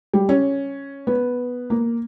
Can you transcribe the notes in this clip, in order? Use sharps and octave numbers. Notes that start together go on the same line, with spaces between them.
G3
C#4
B3
A#3